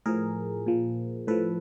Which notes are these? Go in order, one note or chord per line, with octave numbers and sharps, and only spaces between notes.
A2 F3 G#4 A#4
A#2 F3
A2 F3 A4 B4